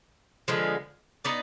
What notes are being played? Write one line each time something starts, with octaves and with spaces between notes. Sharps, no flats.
D3 F3 G#3 B3
B3 D#4 B4 D5